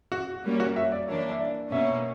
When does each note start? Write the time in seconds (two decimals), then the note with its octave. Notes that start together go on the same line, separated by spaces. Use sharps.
0.12 F#4
0.44 G3 A#3 C#4
0.60 F#4
0.76 E5
0.92 D5
1.08 E3 A#3 D4 C#5
1.31 E5
1.40 D5
1.72 B2 A#3 C#4 E5